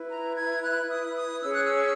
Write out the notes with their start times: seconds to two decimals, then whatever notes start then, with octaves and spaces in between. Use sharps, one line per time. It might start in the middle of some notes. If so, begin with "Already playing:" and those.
Already playing: E4 B4
0.10 A#5
0.36 G#6
0.63 F#6
0.90 D#6
1.16 D#6
1.42 C#4 G#4 C#5 E6
1.53 F#6
1.63 E6